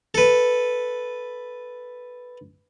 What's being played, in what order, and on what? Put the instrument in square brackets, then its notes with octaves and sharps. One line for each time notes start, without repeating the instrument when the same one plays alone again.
[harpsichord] A4 B4